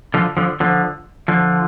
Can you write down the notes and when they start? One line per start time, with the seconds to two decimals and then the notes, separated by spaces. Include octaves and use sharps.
0.14 D3 F3
0.37 D3 F3
0.60 D3 F3
1.28 D3 F3